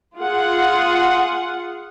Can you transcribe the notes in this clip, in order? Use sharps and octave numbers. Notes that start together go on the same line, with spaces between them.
F4 G#4 F#5